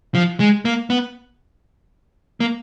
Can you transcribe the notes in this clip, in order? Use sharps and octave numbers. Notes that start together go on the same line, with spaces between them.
F3
G#3
A#3
B3
A#3